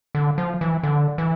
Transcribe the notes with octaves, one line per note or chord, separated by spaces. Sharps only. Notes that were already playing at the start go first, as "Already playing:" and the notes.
D3
F3
E3
D3
E3